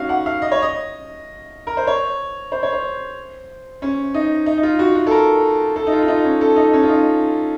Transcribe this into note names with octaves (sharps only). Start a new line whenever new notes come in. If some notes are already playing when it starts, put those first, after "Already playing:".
Already playing: C#4 D#4 F#4 F5
F#5
F5
D#5
C#5
D#5
A#4
C5
C#5
C5
C#5
C5
C#4
D#4
D#4
D#4
F4
F#4
F#4
A4
A#4
A4
D#4
F4
F4
D#4
C#4
A4
D#4
C#4
F4
D#4